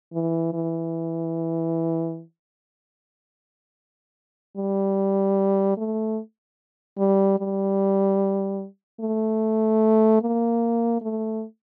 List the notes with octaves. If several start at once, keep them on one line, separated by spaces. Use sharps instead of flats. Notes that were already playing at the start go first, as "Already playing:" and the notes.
E3
E3
G3
A3
G3
G3
A3
A#3
A3